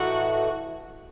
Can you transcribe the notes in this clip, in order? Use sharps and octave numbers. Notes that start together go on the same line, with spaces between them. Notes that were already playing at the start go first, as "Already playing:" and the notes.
Already playing: A2 E3 A3 D#4 F#4